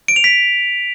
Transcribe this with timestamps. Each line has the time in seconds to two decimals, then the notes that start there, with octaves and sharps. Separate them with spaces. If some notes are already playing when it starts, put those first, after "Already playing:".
0.08 D7
0.16 F7
0.24 B6